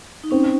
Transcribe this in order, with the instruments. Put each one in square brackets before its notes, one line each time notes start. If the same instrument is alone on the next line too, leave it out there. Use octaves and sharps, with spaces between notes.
[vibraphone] D#4
[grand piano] C4 [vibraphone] C#4